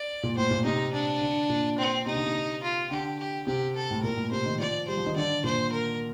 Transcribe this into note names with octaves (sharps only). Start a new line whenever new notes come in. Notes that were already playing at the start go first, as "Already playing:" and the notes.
Already playing: D5
A#2
A2 C5
A#2
C3 D#4
D4
D3
A#2
C4
C3 D#4
D3
C3
F4
D3 G4
G4
C3 G4
A4
A2
A#2 A#4
A2
C3 C5
D#3
F3 D5
G3 C5
F3
D#3
D3 D5
A#2 C5
A#4